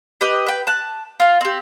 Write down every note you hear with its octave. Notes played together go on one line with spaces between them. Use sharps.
G4 B4 D#5
B4 G5
A5 F#6
F4 F5
C4 G4